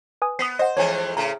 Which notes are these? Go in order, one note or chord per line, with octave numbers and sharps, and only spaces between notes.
B4 G#5 D#6
B3 D#6 B6 C7
C5 D#5 F#5
F2 E3 G#3 C#5 G#5
A2 C#3 A#5